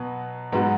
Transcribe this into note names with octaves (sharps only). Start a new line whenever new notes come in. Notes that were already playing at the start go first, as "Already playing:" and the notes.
Already playing: B2 F#3 B3
G#2 F#3 B3 F#4